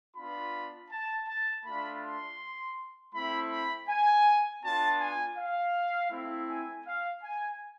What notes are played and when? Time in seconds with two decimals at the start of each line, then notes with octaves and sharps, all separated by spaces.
0.16 B3 D4 F4 B5
0.91 A5
1.27 A5
1.65 A3 D4 F4 B5
2.02 C6
3.14 A3 C4 E4 B5
3.51 B5
3.89 G#5
4.63 B3 D4 F4 A5
5.00 G#5
5.37 F5
6.11 A3 C4 E4
6.49 G#5
6.86 F5
7.23 G#5